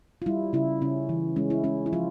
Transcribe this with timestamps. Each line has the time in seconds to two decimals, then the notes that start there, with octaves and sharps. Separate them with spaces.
0.22 F4
0.26 G3 E4
0.53 C#3 E4
0.81 C#3 C#4
1.09 E3
1.36 G#3 C#4
1.50 E4
1.64 G#3 C#4
1.86 E4
1.93 F3 F4